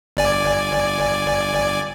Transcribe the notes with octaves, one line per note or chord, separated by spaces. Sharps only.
G1 D5 G#5